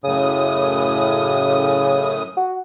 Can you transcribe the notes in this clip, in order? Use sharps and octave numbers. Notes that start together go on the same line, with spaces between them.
F#2 A2 C#3 D#6
F#4